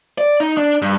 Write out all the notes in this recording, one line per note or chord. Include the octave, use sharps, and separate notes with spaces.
D5
D#4
D4
G2